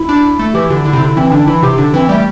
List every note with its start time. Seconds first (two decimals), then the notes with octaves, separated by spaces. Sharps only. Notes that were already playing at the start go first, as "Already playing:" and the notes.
Already playing: E4
0.09 D4
0.39 A3
0.54 E3 G4
0.70 D3 E4
0.85 D3 E4
0.93 C3
1.00 D3 E4
1.16 E3 C4
1.31 D3 D4
1.47 E3 E4
1.62 C3 G4
1.78 D3 D4
1.94 E3 C4
2.08 G3 A3